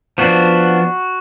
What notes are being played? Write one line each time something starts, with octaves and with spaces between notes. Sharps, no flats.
F3 B3 D4 F#4